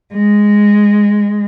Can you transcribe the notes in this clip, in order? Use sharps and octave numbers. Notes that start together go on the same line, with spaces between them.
G#3